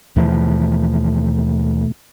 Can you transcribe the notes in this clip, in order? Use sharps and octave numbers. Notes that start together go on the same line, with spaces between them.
D#2 B2 E3 F3 A3